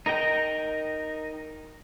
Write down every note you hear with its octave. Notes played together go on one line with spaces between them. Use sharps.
D#4 A#4 D#5 G5 A#5